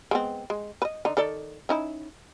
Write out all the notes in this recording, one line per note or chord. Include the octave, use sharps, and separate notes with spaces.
G#3 B3 C4
G#3
B4 D#5
D3 D#4
D#3 A4 D5
C#4 D#4 E4